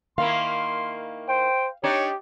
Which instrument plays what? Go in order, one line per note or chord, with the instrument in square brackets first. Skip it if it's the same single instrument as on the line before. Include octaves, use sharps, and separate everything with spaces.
[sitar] D#3 A#3 E4 [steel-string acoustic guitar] F5 [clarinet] C6
[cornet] C5 [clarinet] G5
[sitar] D4 D#4 [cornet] G4 [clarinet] C#5